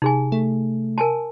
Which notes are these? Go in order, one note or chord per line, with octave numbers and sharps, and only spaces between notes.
C3 D#4 G#4 G#5
A3
A#4 G#5 A5